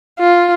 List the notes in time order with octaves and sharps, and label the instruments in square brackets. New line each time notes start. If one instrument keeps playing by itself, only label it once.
[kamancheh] F4